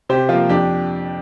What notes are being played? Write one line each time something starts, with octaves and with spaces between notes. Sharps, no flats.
C3 G4 C5
F3 A#3 F4
F2 D4 G4